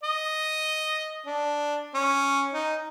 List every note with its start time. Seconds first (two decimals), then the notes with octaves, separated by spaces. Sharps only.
0.03 D#5
1.26 D4
1.94 C#4
2.53 D#4